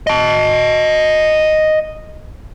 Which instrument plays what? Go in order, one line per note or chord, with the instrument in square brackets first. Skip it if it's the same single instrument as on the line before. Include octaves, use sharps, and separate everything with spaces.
[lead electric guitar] D#5 A5